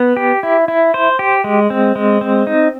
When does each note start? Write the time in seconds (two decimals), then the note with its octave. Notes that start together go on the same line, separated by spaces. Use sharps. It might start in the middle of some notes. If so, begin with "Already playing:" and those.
Already playing: B3
0.17 G4
0.43 E4
0.68 E4
0.94 C5
1.19 G4
1.44 G#3
1.70 C4
1.96 G#3
2.21 C4
2.47 D#4